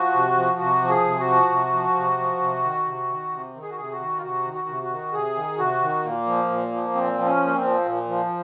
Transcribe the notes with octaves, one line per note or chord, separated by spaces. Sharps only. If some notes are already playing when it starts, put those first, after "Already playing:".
Already playing: F3 F#4
C3
F3
C3 F#4
F3
G#4
C3
F#4
F3
C3
F3
C3
F3
C3
D#3
C3
D#3
C3
D#3
G#4
F#4
C3 G#4
F#4
D#3
F4
C3 F#4
D#3
F#4
C3
F#4
D#3
C3 G#4
D#3
C3 F#4
D#3
A#2 A#3
F3
A#2
F3
A#2 C4
F3
C#4
A#2
C4
F3
A#2
F3